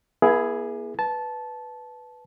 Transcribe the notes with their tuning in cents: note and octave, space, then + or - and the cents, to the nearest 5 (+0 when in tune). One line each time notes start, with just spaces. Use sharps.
B3 -45 E4 +10 G#4 +5
B4 +0 A5 -15